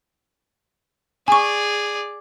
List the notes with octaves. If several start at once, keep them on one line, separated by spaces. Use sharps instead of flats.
G#4 D5 G#5 C#6